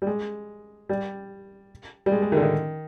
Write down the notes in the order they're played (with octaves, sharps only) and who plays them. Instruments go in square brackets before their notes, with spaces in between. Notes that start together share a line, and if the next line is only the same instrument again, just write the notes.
[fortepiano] G3
G#3
G3
G3
G#3
G#3
D#3
D3
D#3